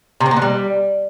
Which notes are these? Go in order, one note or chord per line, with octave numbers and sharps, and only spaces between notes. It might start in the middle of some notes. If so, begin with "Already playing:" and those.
C3
C4
A#3
D3
G3